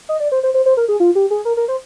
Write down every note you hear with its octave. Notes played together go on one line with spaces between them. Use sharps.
D#5
D5
C5
C5
C5
C5
A#4
G#4
F4
G4
G#4
A#4
A#4
C5